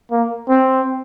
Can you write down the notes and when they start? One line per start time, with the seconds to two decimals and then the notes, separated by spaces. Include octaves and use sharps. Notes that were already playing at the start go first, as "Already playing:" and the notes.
0.12 A#3
0.49 C4